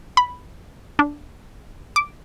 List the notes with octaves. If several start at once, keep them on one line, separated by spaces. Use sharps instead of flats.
B5
D4
D6